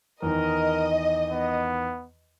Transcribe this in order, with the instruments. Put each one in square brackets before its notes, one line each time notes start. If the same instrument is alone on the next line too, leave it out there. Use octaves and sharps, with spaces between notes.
[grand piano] E2 D#3 [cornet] A#4 [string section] D#5
[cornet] B3